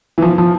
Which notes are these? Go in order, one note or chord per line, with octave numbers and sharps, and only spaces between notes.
E3
F3
F3